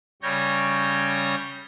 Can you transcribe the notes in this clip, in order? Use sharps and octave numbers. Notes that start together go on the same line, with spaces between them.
C#3 G3 C#5 G6 A#6